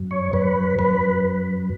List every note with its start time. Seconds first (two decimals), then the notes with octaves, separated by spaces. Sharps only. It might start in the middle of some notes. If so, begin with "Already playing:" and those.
Already playing: F#2
0.11 C#5
0.33 F#2 B4
0.79 F#2 B4